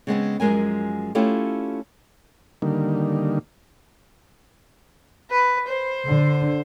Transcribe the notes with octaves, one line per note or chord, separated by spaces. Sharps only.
C#3 G#3 B3 C4
F#2 F3 G#3 A#4 G#5
A3 C#4 E4 F4 G4 A4
D3 D#3 G3 A#3
B4
C5
D3